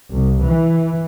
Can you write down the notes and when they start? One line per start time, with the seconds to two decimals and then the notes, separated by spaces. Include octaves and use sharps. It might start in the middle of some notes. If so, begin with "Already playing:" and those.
0.11 C2
0.45 E3